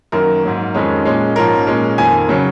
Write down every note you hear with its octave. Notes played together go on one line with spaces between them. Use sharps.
F#2 D#3 F#3 A#3 A#4
G#2 F#3 A#3
F2 D#3 G#3 C#4
A#2 G#3 C#4
G#2 F3 A#3 C#4 A#4
A#2 G#3 C#4
F2 D#3 A#3 G#5
C#3 F#3 C#4